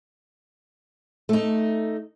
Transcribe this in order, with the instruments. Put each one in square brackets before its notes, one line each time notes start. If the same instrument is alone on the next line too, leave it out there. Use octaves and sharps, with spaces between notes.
[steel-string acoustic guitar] A3 D#4